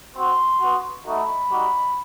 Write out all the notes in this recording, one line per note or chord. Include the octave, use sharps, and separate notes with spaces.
C4 F#4 C6
B3 F#4
A3 D#4 F#4 B5
G3 D#4 F#4